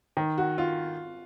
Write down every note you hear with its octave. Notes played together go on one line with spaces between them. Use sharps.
D#3
F#4
F4